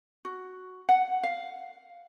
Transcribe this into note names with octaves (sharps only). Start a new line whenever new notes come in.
F#4
F#5
F5